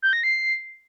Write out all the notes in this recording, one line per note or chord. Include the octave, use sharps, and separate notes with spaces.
G6
A#6
C7